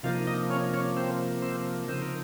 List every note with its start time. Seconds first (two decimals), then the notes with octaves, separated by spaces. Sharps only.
0.03 C3 F3 A#3 D#4 F4 F5
0.27 D#4 D#5
0.50 C#4 C#5
0.74 C#4 C#5
0.97 C4 C5
1.42 C4 C5
1.88 C#3 F3 C4 D#4 C5
2.02 A#4